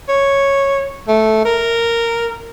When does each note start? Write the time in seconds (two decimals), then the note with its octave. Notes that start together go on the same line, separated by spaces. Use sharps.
0.09 C#5
1.08 A3
1.45 A#4